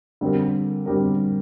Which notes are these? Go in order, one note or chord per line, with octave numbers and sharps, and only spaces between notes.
D3 G3 C4 G4 A#4
D3 G3 C4 G4 A#4